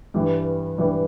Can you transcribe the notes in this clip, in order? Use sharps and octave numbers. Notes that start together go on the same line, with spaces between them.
G2 E3 G3
G2 E3 G3